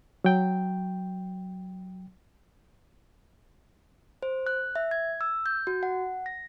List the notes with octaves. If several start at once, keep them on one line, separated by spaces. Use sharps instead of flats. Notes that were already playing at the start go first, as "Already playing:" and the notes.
F#3 G5
C5
F#6
E5
G#6
E6
G6
F#4
F#5
A#6